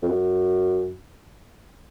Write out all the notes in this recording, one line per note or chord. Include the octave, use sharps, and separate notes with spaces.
F2
F#2